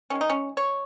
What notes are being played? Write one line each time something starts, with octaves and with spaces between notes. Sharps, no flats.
D#3 G#3 C#4
D#4
C#4
C#5